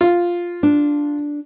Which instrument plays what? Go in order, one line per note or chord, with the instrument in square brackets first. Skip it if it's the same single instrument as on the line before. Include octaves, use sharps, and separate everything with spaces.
[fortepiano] F4
[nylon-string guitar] D4